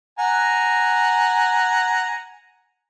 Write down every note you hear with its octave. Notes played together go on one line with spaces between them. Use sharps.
F#5 G#5 A#5